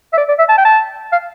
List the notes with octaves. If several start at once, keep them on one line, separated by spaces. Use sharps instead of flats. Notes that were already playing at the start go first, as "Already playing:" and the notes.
E5
D5
D5
E5
A5
G5
A5
F5